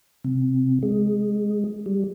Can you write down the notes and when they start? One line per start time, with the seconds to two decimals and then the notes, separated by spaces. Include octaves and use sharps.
0.24 C3
0.83 G#3
1.86 G3